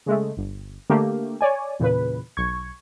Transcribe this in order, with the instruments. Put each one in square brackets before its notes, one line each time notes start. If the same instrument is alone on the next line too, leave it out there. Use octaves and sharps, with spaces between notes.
[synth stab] C#3 G#3 A3
G1
D3 A3 A#3 G4
C#5 D5 G#5
E2 A#2 C#3 B4
B1 C#6 G#6